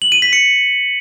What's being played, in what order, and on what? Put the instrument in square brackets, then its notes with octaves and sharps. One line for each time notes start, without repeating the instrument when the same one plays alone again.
[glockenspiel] F#7
D#7
B6
C#7